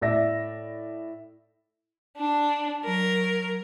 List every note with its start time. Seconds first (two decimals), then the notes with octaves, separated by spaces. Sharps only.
0.01 A2 D5 E5 A#6
2.16 D4
2.83 F#3 A#4